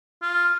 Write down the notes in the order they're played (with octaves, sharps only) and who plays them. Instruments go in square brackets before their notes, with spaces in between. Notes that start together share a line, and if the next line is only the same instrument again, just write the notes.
[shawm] F4